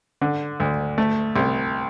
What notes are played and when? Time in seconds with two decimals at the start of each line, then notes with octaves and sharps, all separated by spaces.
0.21 D3
0.60 D2
0.98 A3
1.36 C2